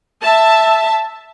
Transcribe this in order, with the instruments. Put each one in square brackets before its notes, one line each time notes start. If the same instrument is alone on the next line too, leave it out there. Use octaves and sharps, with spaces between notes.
[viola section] E5 A5